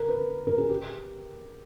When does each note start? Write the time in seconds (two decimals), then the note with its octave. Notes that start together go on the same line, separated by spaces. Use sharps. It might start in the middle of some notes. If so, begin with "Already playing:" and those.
Already playing: A#4
0.09 B4
0.47 A#4
0.58 G#4
0.69 G4